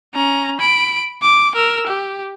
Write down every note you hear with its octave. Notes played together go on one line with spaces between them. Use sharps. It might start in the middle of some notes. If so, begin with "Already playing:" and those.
C#4 A#5
B5 D7
D6
A#4 E6
G4